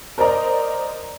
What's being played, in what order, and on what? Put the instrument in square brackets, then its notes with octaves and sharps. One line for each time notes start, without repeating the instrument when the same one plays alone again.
[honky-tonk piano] A#4 C5 D5 D#5 A#5